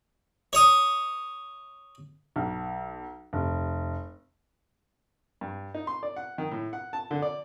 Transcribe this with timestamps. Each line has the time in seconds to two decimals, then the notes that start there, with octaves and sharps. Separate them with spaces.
0.53 C#5 D#6
2.36 B1
3.33 F1
5.41 G2
5.75 D#4
5.87 C6
6.03 D5
6.16 F#5
6.38 D#3
6.51 A2
6.73 F#5
6.93 A5
7.11 D3
7.22 D5